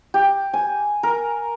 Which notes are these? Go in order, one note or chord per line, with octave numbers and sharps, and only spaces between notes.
G4
G#5
A#4